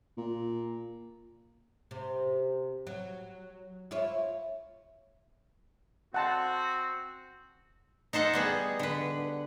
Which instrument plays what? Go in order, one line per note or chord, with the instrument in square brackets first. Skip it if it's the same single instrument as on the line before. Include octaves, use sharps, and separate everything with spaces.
[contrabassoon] A#2
[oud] C3
F#3
E4 F4 C#5
[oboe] C4 [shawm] F#4 [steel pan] F#5 A5 C6
[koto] D#4 A4 C5 F#5
G3 B3 G#4
D3 B4